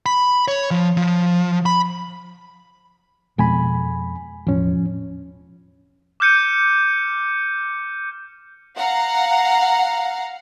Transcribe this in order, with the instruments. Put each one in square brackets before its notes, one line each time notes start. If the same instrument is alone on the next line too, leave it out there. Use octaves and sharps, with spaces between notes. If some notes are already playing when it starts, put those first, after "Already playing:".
[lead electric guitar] B5
C#5
F3
F3
B5
[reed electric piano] F2 G#5 B5 [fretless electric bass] B2 G#3 B3
[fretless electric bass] E1 A2 [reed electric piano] F3 C#4
[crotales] D6 F6 G6 C#7 D#7
[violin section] F5 F#5 A#5